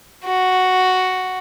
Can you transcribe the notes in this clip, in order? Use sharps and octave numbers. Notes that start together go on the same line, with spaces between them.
F#4